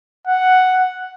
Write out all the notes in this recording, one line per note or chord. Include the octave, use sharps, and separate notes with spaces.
F#5